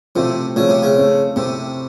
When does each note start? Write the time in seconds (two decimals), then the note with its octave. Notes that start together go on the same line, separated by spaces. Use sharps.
0.16 A2 C3 F3 A3 C4 F4
0.56 A2 C#3 F3 A3 C4 F4
0.69 C3
0.82 C#3
0.96 A2 A3 C4
1.36 A2 C3 A3 C4